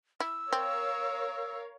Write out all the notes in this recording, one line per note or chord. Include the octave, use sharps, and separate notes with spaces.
E4 E6
C4 A#4 C#5 F5